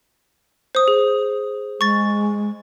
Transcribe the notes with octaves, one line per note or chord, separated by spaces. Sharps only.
C5 D#6
G#4
G#3 C#6 A6